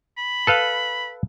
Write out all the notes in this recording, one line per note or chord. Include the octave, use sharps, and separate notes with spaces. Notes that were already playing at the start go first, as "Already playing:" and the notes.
B5
A4 B4 F5